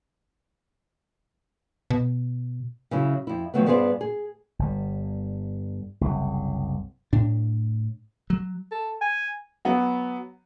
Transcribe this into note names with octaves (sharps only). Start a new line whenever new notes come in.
B2
C#3 F#3 C#4 E4
F2 E4
D#3 F3 F#3 A3 B3
G2 B3 F4 G#4 C5 D5
G#4
G1 G3
F#1 C2
A2 D4
F#3
A4
G#5
F#3 B3